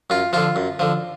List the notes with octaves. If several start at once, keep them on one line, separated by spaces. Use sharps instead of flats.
F#2 F4
D3 F3 F4
F#2
D3 F3